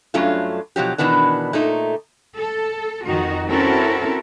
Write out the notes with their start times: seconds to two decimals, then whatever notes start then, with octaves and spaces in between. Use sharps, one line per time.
0.14 G2 F#3 A3 C#4 D4 F4
0.76 B2 F3 F#3 G4
0.98 B2 D#3 E3 B3 D4
1.53 A#2 A3 D#4
2.36 A4
3.05 F2 D#3 D#4 F#4
3.47 C4 C#4 E4 F#4 A4 A#4